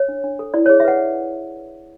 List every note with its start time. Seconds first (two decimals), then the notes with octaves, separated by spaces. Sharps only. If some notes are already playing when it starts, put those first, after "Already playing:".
Already playing: C#5
0.08 D4
0.24 D4
0.39 A4
0.54 E4 D5
0.66 G#4 C#5
0.80 E5
0.85 B4 F#5